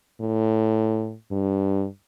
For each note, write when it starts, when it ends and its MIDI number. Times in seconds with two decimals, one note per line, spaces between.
0.21 1.14 45
1.31 1.86 43